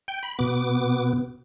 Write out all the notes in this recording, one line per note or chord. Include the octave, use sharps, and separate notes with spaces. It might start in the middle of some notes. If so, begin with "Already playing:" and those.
G5
B5
B2 B3 D6